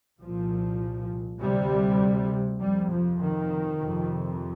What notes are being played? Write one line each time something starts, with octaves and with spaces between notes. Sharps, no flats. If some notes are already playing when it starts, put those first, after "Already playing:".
C2 A#2 F3
D2 C3 G3
F2 C3 G3
F3
D#3
F2 C3